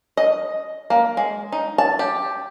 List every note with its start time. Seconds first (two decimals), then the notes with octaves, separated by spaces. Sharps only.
0.17 D#5
0.90 A#3
1.17 G#3
1.52 D#4
1.78 A5
1.99 G4